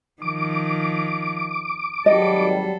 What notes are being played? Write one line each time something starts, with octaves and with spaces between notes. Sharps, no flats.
D#3 F3 D6
G#1 F#3 G3 A4 D#5